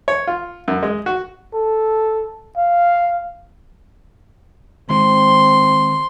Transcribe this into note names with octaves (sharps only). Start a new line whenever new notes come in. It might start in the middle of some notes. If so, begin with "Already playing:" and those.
C#5
F4
F#2
G#3
F#4
A4
F5
D#3 G#3 C4 C6